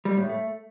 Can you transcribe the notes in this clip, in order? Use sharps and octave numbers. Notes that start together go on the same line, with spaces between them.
G3
A2
A3